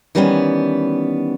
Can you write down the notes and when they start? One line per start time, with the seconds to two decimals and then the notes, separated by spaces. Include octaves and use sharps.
0.15 D#3 E3 G3 A3 B3 C#4